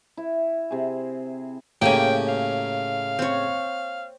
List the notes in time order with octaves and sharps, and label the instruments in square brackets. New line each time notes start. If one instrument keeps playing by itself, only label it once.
[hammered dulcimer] E4
C3 G#4
[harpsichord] A2 C#3 [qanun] A#3 G4 G#5 [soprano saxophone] G5
[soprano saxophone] F5
[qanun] C4 C#5